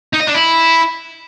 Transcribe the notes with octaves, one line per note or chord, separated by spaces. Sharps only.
D#4
D#5
D4
E4